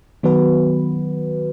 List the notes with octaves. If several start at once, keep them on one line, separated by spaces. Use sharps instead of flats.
D#3 F#3 B3 F#4 B4